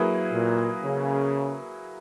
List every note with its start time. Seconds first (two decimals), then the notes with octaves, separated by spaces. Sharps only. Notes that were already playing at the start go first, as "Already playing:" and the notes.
Already playing: F#3 A#3 E4 G#4 B4
0.32 A#2
0.84 C#3